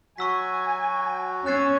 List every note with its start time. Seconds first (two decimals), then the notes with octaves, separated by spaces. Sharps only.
0.18 F#3 F#4 G#5 C#6 E6 B6
1.46 C#4 E6 F#6 A6 C7